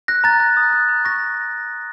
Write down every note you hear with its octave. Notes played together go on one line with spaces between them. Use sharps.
F#6 A#6
A#5 A6
F#6
D#6
F#6
A#5
C#6 A#6